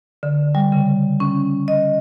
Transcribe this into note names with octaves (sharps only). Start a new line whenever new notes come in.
D3
G3
C#3
C#4
D#5